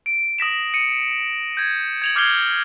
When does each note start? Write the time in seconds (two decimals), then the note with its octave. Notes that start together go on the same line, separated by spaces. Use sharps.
0.06 D7
0.39 D#6 A#6 B6 E7
0.74 C#7 D#7
1.57 G6 G#6
2.02 G#6 F7 F#7
2.16 D6 F6 G6 G#6 C7 G7